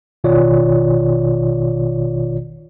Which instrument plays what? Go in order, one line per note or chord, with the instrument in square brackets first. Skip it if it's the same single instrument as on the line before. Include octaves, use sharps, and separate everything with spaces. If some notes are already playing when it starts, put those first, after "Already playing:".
[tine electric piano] A1 B2 D#3 F4 C#5 D5